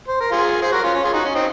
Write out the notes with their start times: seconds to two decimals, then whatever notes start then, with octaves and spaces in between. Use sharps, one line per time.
0.08 C5
0.20 A#4
0.32 F4 G#4
0.62 G#4 C5
0.72 F#4 A#4
0.83 C#4 F4
0.94 C#4
1.03 F4 G#4
1.14 D#4 F#4
1.25 C#4
1.35 C4 D#4